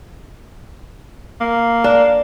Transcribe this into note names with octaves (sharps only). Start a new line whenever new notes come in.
A#3
D4